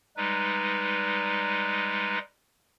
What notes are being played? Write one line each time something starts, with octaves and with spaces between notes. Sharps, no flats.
G3 G#3 D#4 B4